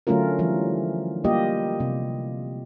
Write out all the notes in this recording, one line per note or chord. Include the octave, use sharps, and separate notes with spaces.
D3 F#3 A3 C#4 F4 A#4
E3 F3 G3
G3 A#3 F4 G4 D#5
C3